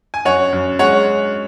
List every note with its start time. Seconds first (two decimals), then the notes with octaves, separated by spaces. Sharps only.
0.14 G#5
0.25 F#2 C#5 F#5
0.53 F#2
0.79 G#3 C#5 F#5